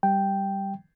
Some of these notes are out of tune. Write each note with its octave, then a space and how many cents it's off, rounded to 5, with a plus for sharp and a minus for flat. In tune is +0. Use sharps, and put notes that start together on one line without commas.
G3 +0 G5 +0